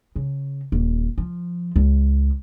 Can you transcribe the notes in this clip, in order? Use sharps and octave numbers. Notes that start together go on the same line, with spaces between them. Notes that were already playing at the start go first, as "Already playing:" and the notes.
C#3
D#1
F3
C#2